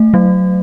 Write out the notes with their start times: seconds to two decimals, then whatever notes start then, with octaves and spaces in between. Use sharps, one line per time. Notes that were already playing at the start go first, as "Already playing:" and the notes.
Already playing: A3
0.14 F#3